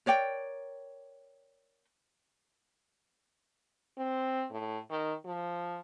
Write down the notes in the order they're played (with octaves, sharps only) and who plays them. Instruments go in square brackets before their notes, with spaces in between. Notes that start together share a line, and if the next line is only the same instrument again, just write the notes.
[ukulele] A#4 C#5 D5 G5
[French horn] C4
A2
D#3
F3